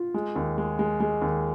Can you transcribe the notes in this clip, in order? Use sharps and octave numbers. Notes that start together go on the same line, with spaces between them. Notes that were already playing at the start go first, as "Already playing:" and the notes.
Already playing: F4
G#3
D#2
G#3
G#3
G#3
D#2